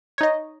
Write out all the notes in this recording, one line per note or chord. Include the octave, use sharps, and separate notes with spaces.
D#4 C#5 D#5